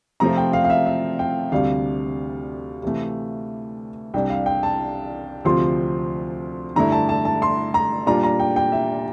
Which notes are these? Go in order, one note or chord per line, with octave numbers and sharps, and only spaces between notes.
C3 F3 A3 C4 F4 A#5
G5
F5
F5
E5
E5
G5
D2 C3 G3 D4 F5
C3 E3 A3
C2 C3 G3 D4 G5
F5
G5
A5
D2 C3 F3 C4 F4 C6
G2 D3 A3 E4 A#5
A5
A5
A5
C6
A#5
A#2 G3 D4 F4 A#5
A#5
G5
G5
E5